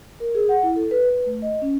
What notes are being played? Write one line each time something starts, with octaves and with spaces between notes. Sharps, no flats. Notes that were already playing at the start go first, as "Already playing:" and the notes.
A#4
G#4
F#5
E4
A4
B4
B4
A3
D#5
C#4